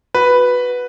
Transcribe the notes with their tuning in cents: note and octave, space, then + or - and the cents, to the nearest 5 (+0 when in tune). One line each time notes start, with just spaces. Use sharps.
F#4 -10 B4 +0